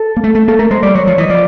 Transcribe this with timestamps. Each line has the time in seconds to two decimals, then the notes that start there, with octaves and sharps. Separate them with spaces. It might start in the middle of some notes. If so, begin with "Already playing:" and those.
Already playing: A4
0.17 A#3
0.24 A3
0.35 A3
0.48 A#3 A4
0.59 A3 A#4
0.71 G#3 C5
0.83 G3 D5
0.95 F#3 C#5
1.07 F3
1.18 E3 D#5
1.30 F3 D5